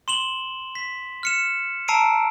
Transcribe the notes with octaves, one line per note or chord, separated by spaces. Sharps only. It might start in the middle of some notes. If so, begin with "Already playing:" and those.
C6 E7 F#7 G7
B6
F6 C#7 E7
A5 A#5 E6 C7 D7 D#7